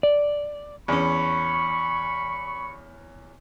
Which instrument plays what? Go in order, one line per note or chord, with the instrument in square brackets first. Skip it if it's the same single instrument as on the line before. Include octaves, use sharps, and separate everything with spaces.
[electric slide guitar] D5
[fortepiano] E2 C#4 [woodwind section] B5 C#6